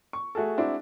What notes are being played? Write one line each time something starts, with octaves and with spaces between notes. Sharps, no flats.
C#6
A3 F#4 G#4 A4
G#3 C4 D4 E4 F#4